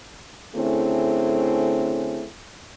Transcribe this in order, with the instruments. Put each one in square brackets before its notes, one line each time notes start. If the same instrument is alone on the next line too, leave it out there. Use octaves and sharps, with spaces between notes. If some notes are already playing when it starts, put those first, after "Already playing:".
[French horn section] D3 A3 C4 C#4 E4 G#4